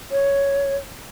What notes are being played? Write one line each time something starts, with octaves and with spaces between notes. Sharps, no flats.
C#5